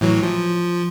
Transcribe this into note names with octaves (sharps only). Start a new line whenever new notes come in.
A2 E3 F#3
F3